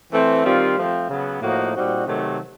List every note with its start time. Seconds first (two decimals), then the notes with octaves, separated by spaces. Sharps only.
0.12 E3 A3 C4
0.44 D#3 G3 C4 F4
0.77 F3 A3 C4
1.09 C#3 F#3 B3
1.42 A2 F3 A#3 D#4 F#4
1.74 A#2 G3 C4 D#4 F#4
2.06 C3 D#3 F#3 A3